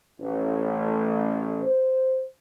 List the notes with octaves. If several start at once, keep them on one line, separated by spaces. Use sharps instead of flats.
A1
C5